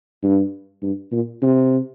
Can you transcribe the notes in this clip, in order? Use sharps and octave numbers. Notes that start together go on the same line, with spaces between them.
G2
G2
A#2
C3